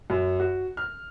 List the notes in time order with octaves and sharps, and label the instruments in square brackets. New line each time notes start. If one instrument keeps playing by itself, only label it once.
[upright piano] F#2
F#4
F6